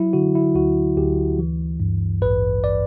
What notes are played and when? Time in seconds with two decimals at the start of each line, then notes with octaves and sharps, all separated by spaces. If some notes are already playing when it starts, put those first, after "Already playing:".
Already playing: F#3 E4
0.13 D3 F#4
0.35 E4
0.55 D2 F#4
0.97 D2 G4
1.39 E3
1.80 G2
2.22 A1 B4
2.64 D5